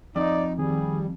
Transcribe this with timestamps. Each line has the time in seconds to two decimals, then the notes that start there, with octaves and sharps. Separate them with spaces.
0.16 F2 D#4 D5
0.58 D#3 G3 C4 G#4